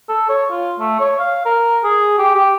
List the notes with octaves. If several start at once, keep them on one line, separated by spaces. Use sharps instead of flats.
A4
C#5
F4
A3
C#5
F5
A#4
G#4
G4
G4